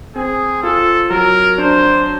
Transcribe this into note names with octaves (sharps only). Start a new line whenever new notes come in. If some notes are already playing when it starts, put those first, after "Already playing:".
C4 G#4
F4 A4
F#3 A#4
D4 C5